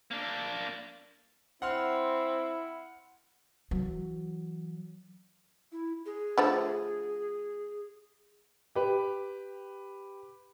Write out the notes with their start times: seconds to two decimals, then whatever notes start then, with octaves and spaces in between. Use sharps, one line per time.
0.11 A#3 D4
1.62 C4 E4 F#5 C6 F6
3.71 E3 F#3
5.72 E4
6.06 G#4
6.38 D3 F3 A3
8.75 G4 B4